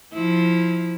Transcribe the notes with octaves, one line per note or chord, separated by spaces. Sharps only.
F3 E4